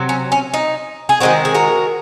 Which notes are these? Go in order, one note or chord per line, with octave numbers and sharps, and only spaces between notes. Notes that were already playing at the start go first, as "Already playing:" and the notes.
Already playing: C3 F#3
C#4
C#4
D#4
G#4
D#3 G#3 C4 D#4 F#4
G#4
F#4 A#4